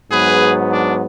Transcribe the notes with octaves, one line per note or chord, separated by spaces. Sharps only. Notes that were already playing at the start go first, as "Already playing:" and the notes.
G#2 F#3 B3 G#4 B4
D4